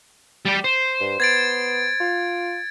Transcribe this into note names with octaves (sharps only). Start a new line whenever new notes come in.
G3 G5
C5
G2
B3 G#6 A6 D7
F4